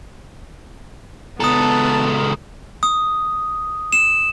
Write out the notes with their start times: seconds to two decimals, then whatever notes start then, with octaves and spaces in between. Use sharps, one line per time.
1.40 C#2 B3 A4 A5 A#5 D#6
2.83 D#6
3.93 E7